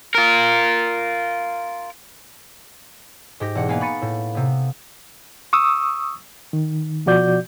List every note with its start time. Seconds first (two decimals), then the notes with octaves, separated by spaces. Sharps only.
0.15 F4 A#4
3.40 G#2 G4 A#6
3.55 E1 F#5
3.68 A#3 B3 B4 F5 G#5
3.81 B5 C#6 A6 C#7 D#7
4.02 A2
4.35 C3 B3
5.53 C#6 D#6 E6
6.53 D#3
7.06 B2 F3 F#4 D5 G6